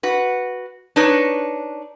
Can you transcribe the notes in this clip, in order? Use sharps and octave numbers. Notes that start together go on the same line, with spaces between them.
F#4 B4
D4 D#4 B4 C#5